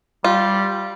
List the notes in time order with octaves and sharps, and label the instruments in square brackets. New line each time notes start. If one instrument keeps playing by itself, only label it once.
[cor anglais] G3 [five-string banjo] F4